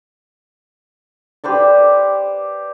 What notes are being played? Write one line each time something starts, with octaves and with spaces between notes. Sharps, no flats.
G4 B4 C5 D5